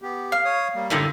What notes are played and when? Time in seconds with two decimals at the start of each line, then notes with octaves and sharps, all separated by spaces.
0.02 B3 G4
0.32 F5
0.45 C#5 D#6
0.75 G3 A#3
0.90 F#2 A2 D3